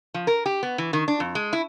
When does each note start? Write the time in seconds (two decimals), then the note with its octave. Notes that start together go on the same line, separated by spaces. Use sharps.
0.14 F3
0.27 A#4
0.46 G4
0.63 B3
0.78 E3
0.93 D#3
1.08 D4
1.20 F2
1.35 G#3
1.53 E4